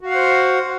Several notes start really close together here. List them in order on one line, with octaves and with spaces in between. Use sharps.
F#4 F5 F#5 C5